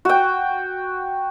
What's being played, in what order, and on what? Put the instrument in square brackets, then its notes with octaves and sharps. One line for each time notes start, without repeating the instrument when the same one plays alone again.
[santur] F#4 G5